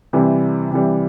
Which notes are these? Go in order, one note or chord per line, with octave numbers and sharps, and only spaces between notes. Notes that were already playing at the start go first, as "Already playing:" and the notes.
C3 E3 G3
C3 E3 G3